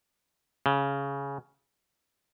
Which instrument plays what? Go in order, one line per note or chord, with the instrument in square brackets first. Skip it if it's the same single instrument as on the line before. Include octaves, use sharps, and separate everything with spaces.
[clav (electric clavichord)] C#3